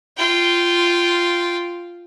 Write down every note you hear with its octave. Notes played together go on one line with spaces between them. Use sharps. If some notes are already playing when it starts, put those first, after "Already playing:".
F4 G5